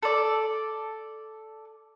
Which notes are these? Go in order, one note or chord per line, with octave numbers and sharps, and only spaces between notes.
A4 D5